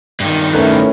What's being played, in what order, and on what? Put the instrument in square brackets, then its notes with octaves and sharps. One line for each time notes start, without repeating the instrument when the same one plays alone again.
[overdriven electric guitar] G2 D#3
[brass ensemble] A2 [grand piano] C#4 A#4 B4